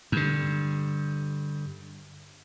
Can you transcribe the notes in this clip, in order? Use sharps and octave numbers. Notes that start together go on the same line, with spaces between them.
G2 D3